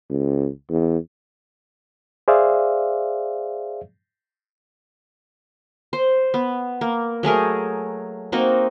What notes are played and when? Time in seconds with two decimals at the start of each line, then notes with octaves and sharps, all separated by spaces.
0.10 C#2
0.69 E2
2.28 G#4 C5 D5 E5 F5
5.93 C5
6.34 B3
6.81 A#3
7.23 F#3 A3 G#4 A#4
8.32 A#3 C4 D#4 F#4